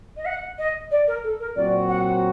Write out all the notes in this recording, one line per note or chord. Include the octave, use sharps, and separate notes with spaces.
D#5
F#5
D#5
D5
A#4
A4
A#4
A#2 F#3 C4 F#4 D5
F#5